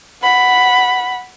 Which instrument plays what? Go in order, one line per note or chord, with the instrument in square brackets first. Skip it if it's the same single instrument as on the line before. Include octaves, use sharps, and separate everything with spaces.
[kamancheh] F#5 B5